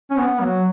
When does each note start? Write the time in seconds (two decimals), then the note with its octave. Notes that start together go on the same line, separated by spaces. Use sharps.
0.11 C#4
0.17 B3
0.40 F#3